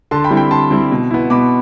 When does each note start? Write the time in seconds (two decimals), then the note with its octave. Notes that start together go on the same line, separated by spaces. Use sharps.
0.11 D3 A5 C6
0.24 G5 B5
0.30 G3 C4 E4
0.37 G5 B5
0.51 D3 A5 C6
0.71 G3 C4 E4
0.91 B2
1.11 B3 E4
1.30 B2 B5 D6